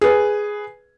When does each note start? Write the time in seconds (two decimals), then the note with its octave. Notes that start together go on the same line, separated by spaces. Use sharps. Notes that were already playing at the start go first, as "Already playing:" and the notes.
0.01 G#4 B4